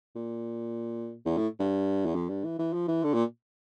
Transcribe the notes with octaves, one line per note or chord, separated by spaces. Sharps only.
A#2
E2
A2
G2
E2
F2
G2
E3
E3
F3
E3
D3
A#2